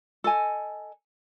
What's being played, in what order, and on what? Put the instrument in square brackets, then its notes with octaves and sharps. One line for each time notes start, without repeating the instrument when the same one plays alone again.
[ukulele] A4 D#5 G#5